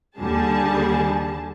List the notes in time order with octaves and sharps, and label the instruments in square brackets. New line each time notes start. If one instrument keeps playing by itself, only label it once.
[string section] D#2 D3 G3 G#4 A5